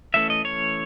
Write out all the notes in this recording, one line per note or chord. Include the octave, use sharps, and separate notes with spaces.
E3 A3 C#4 E5
D#5
C#5